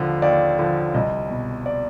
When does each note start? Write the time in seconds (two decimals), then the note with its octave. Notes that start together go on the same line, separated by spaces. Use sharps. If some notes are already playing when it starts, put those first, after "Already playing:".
Already playing: D#2 D3 F3
0.22 D#2 D5
0.59 D3 F3
0.94 C2 D#5
1.30 B2
1.66 D5